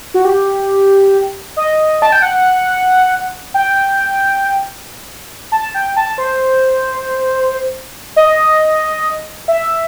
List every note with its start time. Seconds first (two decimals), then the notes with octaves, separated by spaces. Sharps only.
0.14 F#4
0.25 G4
1.56 D#5
2.02 A5
2.12 G5
2.22 F#5
3.54 G5
5.52 A5
5.74 G5
5.96 A5
6.18 C5
8.16 D#5
9.48 E5